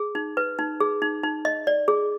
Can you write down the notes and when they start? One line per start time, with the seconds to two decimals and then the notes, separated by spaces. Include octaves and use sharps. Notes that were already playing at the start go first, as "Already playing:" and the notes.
Already playing: G#4
0.15 D#4
0.37 B4
0.59 D#4
0.80 G#4
1.02 D#4
1.23 D#4
1.45 D#5
1.67 D5
1.88 G#4